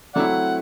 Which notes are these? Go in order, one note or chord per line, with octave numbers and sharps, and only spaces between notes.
F#3 A3 C4 E4 D5 F#5